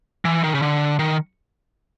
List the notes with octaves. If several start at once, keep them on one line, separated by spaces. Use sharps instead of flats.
E3
D#3
C#3
D3
D#3